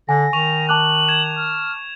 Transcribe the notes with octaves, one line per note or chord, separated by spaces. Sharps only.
D3 G#5 A#6
D#3 C#6 F7
A5 D6 F#6 F#7
G#6 E7
F6